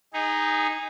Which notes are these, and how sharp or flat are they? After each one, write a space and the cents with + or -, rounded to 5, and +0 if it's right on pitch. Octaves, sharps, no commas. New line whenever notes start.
D#4 +0 G#4 -25